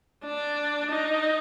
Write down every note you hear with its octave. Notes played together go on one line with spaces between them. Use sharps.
D4
D#4